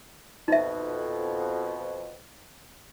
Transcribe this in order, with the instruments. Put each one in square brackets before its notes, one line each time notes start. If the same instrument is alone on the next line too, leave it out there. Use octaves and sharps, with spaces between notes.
[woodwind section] F2 B2 [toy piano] D#4 E5